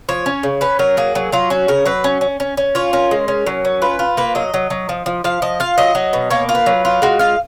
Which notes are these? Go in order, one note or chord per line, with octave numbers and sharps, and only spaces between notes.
F3 C#5
C#4
C#3
C#4 B4
F#3 A#4
A#3 G#4
F#3
F#3 F4
C#4 F#4
C#3 A#4
F#3 B4
C#4
C#4
C#4
C#4
F4 C#5
C#4 A#4
G#3
C#4
F#3
C#4
F4 B4
F4
A#3 B4
F#3 D#5
F#3
F#3
F3
F3
F3 F5
F3 D#5
F4 F5
F#3 D#5
F#3
B2
A#3 C#5
F4
B4
F#3
F4
G#3 F#4
F4 F5